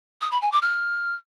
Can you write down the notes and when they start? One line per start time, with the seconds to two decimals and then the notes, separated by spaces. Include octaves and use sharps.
0.21 D#6
0.31 B5
0.41 G#5
0.52 D6
0.62 F6